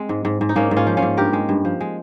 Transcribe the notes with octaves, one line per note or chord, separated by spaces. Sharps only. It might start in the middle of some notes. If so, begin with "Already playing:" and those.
Already playing: G#3 C4
G#2
G#2
G#2
D#4
G#2 A#3 C#4
G#2
C#4 F4
F3
C#4 F4
G#2
G2 G4 A#4
G#3
G2
F3
G#3